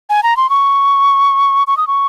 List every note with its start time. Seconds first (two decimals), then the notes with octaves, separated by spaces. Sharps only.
0.10 G#5
0.23 A#5
0.37 C6
0.50 C#6
1.67 C#6
1.77 D#6
1.87 C#6